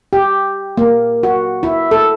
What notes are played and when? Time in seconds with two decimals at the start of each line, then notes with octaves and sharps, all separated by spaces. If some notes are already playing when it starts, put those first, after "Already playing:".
0.13 G4
0.77 A#3
1.23 F#4
1.63 E4
1.91 A4